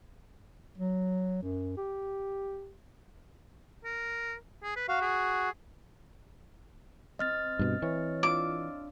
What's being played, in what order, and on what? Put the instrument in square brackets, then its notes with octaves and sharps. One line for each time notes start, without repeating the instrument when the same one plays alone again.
[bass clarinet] F#3
F#2
G4
[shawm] A#4
G#4
B4
[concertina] F#4 [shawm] F5
[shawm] G#4
[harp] C4 [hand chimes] D#5 F6 A6
[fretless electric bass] G2 B2
[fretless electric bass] E3 [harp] C#5
[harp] D4 F4 E6 [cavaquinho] D6